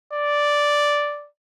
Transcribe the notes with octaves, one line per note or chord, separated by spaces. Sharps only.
D5